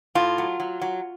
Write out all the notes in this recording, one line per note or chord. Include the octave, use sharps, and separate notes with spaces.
A2 F4
F#3
F#3
F#3